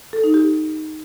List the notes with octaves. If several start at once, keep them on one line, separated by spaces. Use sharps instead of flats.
A4
D#4
G4